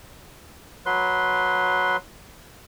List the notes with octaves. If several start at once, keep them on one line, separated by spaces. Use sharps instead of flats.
F#3 B4 C6